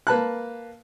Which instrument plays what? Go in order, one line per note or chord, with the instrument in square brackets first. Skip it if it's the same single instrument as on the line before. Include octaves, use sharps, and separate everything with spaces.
[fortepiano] A#3 B4 A5 F#6